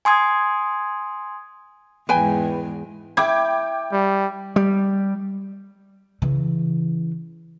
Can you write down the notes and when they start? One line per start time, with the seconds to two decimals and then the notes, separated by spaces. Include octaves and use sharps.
0.05 G#5 C6 D#6 G#6
2.09 E2 G#2 B4 G5 G#5
3.17 E4 G5 D6 G#6
3.92 G3
4.56 G3
6.22 C#3 E3